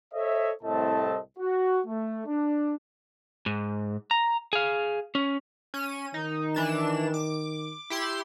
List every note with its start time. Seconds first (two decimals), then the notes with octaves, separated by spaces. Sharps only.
0.13 A4 C5 C#5 D#5 E5
0.63 C2 A2 A3 C4 D#5 A5
1.39 F#4
1.86 A3
2.26 D4
3.46 G#2
4.11 A#5
4.53 G#4 F5
5.15 C#4
5.74 C#4 D#7
6.14 D#3 D#4
6.54 E3 D4 E7
7.14 D6
7.90 E4 G4 C6